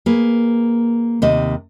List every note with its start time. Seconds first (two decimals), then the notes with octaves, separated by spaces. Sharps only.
0.06 A#3 G#4 B4
1.22 D#2 C3 D#5